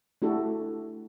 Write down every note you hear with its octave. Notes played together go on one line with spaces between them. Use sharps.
A3 D4 E4 F#4 G4 A4